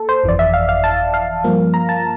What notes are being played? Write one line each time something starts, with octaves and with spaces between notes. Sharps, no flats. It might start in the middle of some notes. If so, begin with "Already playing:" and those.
Already playing: A#3 A4
C5
G1 F2 E3 D5
E5
F5
F5
A5
F5
G2 F3 A#3
A#5
A5